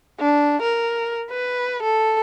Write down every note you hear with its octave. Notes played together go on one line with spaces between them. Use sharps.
D4
A#4
B4
A4